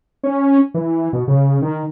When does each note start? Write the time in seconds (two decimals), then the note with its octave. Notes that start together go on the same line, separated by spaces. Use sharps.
0.24 C#4
0.74 E3
1.13 B2
1.28 C#3
1.62 D#3